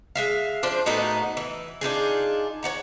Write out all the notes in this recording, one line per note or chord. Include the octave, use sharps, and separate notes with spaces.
G#3 E5 F5
F3 D4 C5
A2 B3 D#4 F#4
E3
D4 D#4 F4 G#4
C#5 D5 F#5 A#5